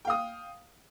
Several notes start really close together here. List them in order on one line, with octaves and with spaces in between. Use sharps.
G5 F5 D#6